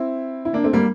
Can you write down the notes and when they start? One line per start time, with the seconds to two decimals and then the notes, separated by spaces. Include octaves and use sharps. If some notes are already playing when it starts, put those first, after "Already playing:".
Already playing: C4 E4
0.45 E4
0.53 A#3 D4
0.64 A3 C4
0.73 G3 A#3